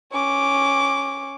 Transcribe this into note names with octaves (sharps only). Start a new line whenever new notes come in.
C#4 D6